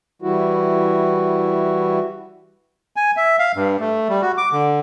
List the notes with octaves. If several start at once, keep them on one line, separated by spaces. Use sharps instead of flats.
E3 G3 E4 F#4
G#5
E5
F5
G2
A3
G3
F#4
D6
D3